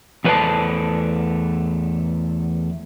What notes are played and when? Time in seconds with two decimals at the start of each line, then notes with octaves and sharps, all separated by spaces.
0.24 E2 A3 B4 C5 D5 A5